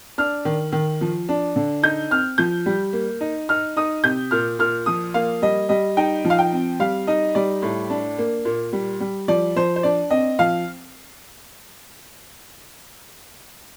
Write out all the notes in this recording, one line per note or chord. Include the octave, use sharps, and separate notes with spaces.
D4 F6
D#3
D#3
F3
D4
D3
D#4 G6
C4 F6
F3 G6
G3
A#3
D#4
D#4 F6
D#4 D#6
C3 G6
A#2 F6
A#2 F6
F3 D#6
A#3 F5
G3 D#5
G3 D#5
D#4 G5
F3
F5
G5
C4
G3 F5
D#4 D#5
G3 D5
A2
D4
A#3
A#2
G3
G3
F3 D5
F3 C5
C5
D4 D5
C4 D#5
F3 F5